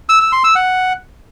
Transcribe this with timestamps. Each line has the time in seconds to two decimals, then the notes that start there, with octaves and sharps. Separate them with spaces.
0.09 E6
0.21 E6
0.32 C6
0.44 E6
0.56 F#5